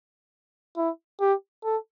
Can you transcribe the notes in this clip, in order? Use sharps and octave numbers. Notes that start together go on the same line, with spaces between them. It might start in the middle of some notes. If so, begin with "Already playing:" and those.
E4
G4
A4